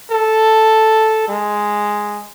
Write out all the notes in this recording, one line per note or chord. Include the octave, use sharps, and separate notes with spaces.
A4
G#3